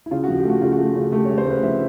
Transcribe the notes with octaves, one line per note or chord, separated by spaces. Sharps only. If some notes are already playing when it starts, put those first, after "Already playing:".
E4
C#3 F4
F#4
F3
G4
A3 F#4
C#3 F4
F#4
A3
C#3
A3 G4
C#5
A3
C5
C#3 B4
F3 E5